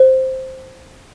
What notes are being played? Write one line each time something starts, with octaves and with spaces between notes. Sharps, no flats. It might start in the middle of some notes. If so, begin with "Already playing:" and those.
Already playing: C5